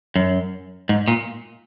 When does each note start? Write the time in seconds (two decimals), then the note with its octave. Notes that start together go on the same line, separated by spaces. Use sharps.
0.16 F#2
0.89 G#2
1.08 A#2